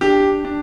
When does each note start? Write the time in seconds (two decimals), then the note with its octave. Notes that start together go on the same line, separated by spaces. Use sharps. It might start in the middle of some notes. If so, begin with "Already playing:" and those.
0.01 D4 G4
0.45 D4